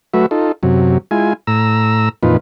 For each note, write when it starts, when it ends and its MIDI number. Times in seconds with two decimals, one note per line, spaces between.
0.14 0.26 54
0.14 0.26 57
0.14 0.26 66
0.14 0.26 71
0.14 0.26 76
0.31 0.52 63
0.31 0.52 65
0.31 0.52 69
0.63 0.98 42
0.63 0.98 48
0.63 0.98 54
1.11 1.33 56
1.11 1.33 64
1.11 1.33 65
1.11 1.33 80
1.47 2.09 45
1.47 2.09 82
1.47 2.09 88
2.23 2.37 41
2.23 2.37 46
2.23 2.37 52
2.23 2.37 63
2.23 2.37 65
2.23 2.37 71